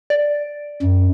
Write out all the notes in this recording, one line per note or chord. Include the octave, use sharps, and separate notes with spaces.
D5
F#2